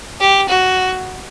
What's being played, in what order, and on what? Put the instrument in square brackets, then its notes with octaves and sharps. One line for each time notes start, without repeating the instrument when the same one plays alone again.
[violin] G4
F#4